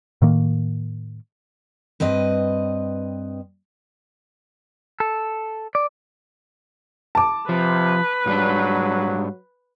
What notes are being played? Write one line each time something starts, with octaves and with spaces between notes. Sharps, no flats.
A2 D#3 A#3
G2 C4 B4 D#5
A4
D5
A5 D6
C3 F3 B4
G#2 F#3 G3 D4